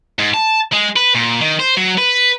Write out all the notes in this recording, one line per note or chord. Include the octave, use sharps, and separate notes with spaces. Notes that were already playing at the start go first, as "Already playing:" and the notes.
G#2
A5
G#3
B4
A#2
D#3
C5
F#3
B4